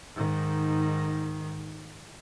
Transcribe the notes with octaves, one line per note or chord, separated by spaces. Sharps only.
G#2 D#3